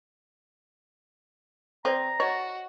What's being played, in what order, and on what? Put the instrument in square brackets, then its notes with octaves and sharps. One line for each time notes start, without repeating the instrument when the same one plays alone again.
[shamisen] C4 [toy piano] A4 C5 D5 [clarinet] A#5
[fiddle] F#4 [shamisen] C#5 [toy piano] D#5